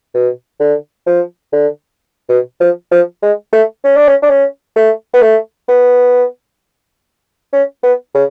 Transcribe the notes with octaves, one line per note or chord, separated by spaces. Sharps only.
B2
D3
F3
D3
B2
F3
F3
G#3
A3
C#4
D4
C#4
D4
C#4
A3
B3
A3
B3
C#4
B3
C#3